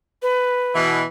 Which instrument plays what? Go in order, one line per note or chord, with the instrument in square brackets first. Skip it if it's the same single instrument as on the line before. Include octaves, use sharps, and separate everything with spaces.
[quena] B4
[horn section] B2 E3